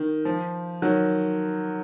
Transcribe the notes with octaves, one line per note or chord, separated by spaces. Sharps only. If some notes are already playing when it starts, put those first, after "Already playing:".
Already playing: D#3
F3
D#3 F#3